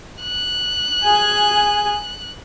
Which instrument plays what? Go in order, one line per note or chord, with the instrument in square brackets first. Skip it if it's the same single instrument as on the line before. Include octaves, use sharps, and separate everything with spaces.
[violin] F#6
[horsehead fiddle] G#4 G#5